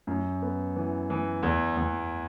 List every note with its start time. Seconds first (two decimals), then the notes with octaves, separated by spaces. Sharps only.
0.07 F#2
0.42 B3
0.76 E3
1.10 E3
1.43 E2
1.77 E2